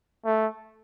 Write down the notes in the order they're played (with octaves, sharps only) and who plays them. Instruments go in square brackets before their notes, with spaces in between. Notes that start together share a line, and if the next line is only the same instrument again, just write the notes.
[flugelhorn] A3